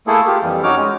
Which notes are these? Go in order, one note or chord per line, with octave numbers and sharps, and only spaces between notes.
A3 A#3 E4 G#4 A4
F4 G4
F2 E3 G3
C#4 D#4 F#4 C#5 D6 F6
G#3 C#4